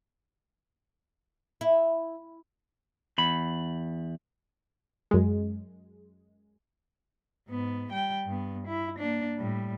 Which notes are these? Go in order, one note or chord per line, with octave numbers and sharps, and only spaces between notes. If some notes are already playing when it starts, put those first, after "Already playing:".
E4
E2 B5
F#2 G#3
G#2 B3
G3 G5
G2 B3
E4
A#3 D4
A2 G3